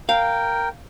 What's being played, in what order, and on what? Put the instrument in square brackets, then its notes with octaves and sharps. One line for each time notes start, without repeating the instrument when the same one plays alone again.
[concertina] A#4 G5 [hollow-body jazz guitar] F5